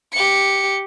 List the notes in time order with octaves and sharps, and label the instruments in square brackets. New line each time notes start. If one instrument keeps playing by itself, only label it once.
[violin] G4 C#7